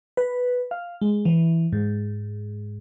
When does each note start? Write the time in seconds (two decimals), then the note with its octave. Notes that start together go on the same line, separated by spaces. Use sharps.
0.17 B4
0.71 F5
1.01 G#3
1.25 E3
1.73 G#2